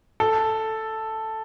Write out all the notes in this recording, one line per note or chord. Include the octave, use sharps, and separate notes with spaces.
A4